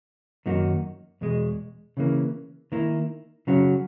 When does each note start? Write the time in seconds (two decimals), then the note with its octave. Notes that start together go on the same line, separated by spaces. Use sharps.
0.46 F#2 D#3 A#3 D#4 F#4
1.21 E2 B2 G#3
1.97 C#3 E3 A#3
2.72 D#3 A#3 E4
3.47 C#3 F#3 C#4 F#4